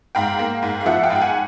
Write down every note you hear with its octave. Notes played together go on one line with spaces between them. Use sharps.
G#2 F5 G5
A#3
G#2
F5
F3 E5 F#5
F5 G5
G#2
G5
F#5 G#5